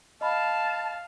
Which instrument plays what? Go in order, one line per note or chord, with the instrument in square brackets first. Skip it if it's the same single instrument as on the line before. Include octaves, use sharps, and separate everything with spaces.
[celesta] D#5 B5 [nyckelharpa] F5 [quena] A5